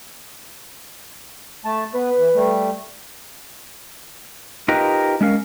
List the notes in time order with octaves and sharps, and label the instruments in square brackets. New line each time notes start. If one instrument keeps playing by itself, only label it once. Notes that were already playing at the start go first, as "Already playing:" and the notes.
[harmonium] A3 A5
[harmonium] B3 [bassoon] B4
[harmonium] E3
G3 A3
[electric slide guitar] D#4 F4 G4 A#4 B4 D#5
G#3 C#4 A#4 F5